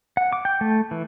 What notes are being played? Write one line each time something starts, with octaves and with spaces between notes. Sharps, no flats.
F#5
D6
G5
A3
E3